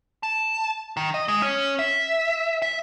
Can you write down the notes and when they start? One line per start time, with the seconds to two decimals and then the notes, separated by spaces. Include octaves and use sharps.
0.23 A5
0.97 D#3
1.14 D#5
1.28 G#3
1.42 C#4
1.79 E5
2.62 E5